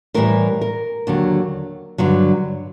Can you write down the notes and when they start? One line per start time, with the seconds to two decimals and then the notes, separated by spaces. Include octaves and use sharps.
0.14 A2 E3 G3 A#4
0.61 A#4
1.07 D#2 D3 F#3
1.98 G2 D3 F#3